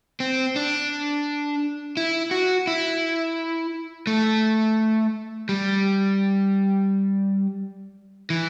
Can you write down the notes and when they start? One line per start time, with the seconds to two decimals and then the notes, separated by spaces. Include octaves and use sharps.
0.20 C4
0.56 D4
1.97 E4
2.31 F#4
2.67 E4
4.07 A3
5.49 G3
8.30 E3